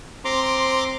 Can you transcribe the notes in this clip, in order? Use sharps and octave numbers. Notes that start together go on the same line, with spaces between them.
C4 A#5 C6 D6